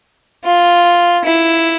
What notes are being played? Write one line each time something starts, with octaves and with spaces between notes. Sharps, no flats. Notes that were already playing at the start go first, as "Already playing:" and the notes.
F4
E4